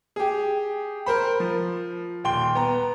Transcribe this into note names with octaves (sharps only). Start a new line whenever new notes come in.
G4 G#4
A#4 C5 B5
F3
D#1 G5 C6 G7
B3 A#5